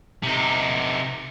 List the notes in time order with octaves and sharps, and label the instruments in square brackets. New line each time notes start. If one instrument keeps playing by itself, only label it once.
[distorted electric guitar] C3 D#4